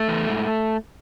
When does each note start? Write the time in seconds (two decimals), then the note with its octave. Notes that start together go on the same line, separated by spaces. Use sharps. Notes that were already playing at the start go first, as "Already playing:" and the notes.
Already playing: A3
0.08 E2
0.29 G#2